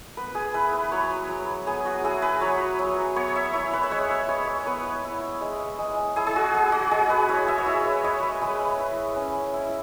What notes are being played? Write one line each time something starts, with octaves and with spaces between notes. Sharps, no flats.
B3 B4
G#4
E4 B4
B4
F#3 C#5
F#3
B3 G#4
F#4
E4 G#4
B4
F#3 C#5
F#3
B3 C#5
E5
E4 C#5
B4
E5
G#3 C#5
E5
G#3 C#5
C#5
B3 B4
E4
G#3
G#3
E4 G#4
G#4
F#4
G#3 G#4
F#4
G#3 G#4
B4
E4 C#5
E5
C#5
E4 E5
B4
G#3 C#5
B4
G#3 B4
E4
C#4
E4